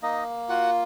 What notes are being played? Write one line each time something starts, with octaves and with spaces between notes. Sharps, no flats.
A#3 D#4 D#5
F4 F#4 F#5